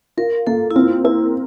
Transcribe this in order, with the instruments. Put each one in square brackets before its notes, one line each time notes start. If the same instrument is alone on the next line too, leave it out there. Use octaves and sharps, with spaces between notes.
[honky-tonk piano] F4 [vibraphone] A#4
[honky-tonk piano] A#3 [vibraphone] A4
[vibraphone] E4
[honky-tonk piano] C4 [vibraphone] F4
[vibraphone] E4 [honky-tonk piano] A#4